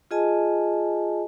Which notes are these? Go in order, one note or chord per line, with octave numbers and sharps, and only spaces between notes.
F4 G#4 D#5 G#5 A5